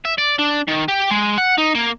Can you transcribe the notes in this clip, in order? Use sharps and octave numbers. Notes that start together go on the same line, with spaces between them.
E5
D5
D4
D#3
G4
G#3
F#5
D#4
A#3